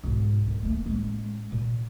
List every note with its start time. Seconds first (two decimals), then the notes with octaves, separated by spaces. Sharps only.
0.04 B1 G#2
0.48 D#3
0.63 A3 A#3
0.86 A1 G#3
1.52 A#2